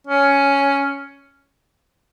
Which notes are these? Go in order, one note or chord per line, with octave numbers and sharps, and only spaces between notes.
C#4